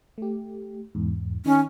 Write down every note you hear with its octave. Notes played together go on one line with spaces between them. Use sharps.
A3 G4
E2 G#2
D#3 C#4 D#4